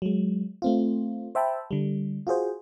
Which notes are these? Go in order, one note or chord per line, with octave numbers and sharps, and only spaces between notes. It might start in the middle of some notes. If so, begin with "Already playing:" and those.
F#3 G#3
A3 C4 F4
C5 E5 G5 A5 B5
D3 G3
F4 F#4 G#4 C5